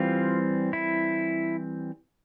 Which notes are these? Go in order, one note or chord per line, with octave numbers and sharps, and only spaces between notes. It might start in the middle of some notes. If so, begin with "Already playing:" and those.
Already playing: E3 G3 C4 F4
E4